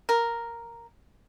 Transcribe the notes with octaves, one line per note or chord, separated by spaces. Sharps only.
A#4